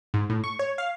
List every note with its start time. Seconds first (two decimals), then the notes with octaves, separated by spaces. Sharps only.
0.14 G#2
0.30 A2
0.44 C#6
0.59 C#5
0.78 F5